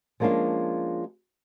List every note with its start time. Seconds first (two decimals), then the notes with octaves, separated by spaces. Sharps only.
0.20 F3 G#3 A#3 C#4 D4 F4